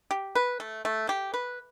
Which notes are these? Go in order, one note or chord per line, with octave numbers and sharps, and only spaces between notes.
G4
B4
A3
A3
G4
B4